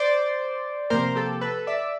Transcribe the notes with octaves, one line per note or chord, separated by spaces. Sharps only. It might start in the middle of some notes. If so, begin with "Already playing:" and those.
Already playing: C5 D5
C3 F3 A#3 A#4 C5
G4 A4
A4 B4
D5 E5